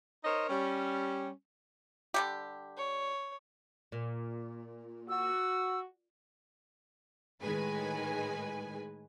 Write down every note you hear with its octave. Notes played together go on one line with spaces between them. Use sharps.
D#4 A#4 C5 C#5 D#5
G3 C#4
D3 G3 G4
C#5
A#2
F#4 E6
A2 D#3 G#3 B4 G#5